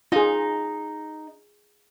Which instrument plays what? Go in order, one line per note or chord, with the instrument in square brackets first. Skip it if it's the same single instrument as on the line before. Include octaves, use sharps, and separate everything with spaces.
[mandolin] D#4 [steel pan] F4 G#4